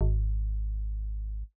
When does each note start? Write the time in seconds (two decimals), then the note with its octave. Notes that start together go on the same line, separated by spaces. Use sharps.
0.01 G#1